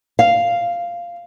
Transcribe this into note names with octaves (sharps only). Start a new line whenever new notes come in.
F5